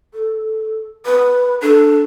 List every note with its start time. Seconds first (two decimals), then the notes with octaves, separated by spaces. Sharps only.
0.14 A4
1.06 B4
1.62 D4 A4